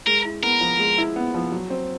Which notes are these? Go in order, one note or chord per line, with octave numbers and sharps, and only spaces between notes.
G#3 A#4
E4
B3 A#4
F3
G#3
E4
B3
F3
F#3
C4